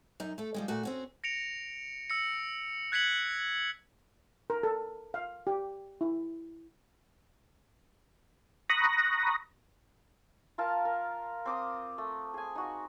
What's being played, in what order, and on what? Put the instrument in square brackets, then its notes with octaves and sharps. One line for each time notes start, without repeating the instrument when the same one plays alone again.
[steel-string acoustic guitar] F#2 D#4
A3 A4
F3 G3 G#3
A#2 A3 F#4
C4 C#4 F#4
[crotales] A#6 C#7 D7 F7
E6 A#6 C#7
F#6 G#6 B6 C#7 F#7
[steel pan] A#4
A4
F5
G4
E4
[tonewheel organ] A#5 B5 C#6 D#6 F#6 A#6
[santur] F4 A#4 F5 A5
A#4
C4 D6 D#6
A3
G#4 G#5
D#4 F#4